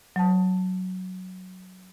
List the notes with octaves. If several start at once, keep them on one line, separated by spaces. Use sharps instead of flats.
F#3 A5